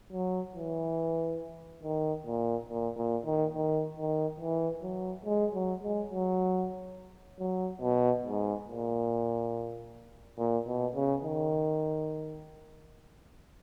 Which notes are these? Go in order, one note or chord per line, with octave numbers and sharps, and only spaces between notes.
F#3
E3
D#3
A#2
A#2
A#2
D#3
D#3
D#3
E3
F#3
G#3
F#3
G#3
F#3
F#3
B2
G#2
A#2
A#2
B2
C#3
D#3